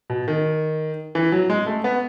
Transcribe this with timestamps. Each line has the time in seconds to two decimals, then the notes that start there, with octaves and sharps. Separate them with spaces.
0.10 B2
0.28 D#3
1.15 E3
1.32 F#3
1.50 G#3
1.66 A3
1.84 B3